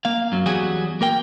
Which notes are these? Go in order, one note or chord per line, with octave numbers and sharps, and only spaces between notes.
A#3 F5
F#2 F#3
E2 F#3 G3 F#4 G#4
A#3 A#4 G5